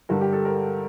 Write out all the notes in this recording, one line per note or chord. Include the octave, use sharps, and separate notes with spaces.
G2 D3 G3 A#4
G4
A4
A#4